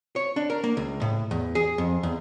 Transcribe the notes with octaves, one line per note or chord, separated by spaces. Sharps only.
C#5
D4
A#4
A#3
C#2
A2
E2
G#4
F2
E2